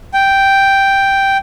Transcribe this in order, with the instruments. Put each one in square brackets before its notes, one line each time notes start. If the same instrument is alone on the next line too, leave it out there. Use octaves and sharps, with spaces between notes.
[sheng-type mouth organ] G5